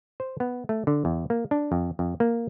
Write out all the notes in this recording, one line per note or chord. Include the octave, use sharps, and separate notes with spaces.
C5
B3
A3
D3
E2
A#3
D4
F2
F2
A#3